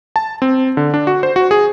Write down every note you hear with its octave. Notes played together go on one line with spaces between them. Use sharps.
A5
C4
D3
D4
F#4
C5
F#4
G#4